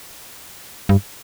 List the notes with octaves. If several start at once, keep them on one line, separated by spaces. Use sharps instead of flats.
G2